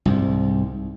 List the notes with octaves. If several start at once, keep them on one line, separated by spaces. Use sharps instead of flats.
C2 G#2